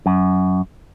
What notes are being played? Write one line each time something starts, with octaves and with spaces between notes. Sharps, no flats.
F#2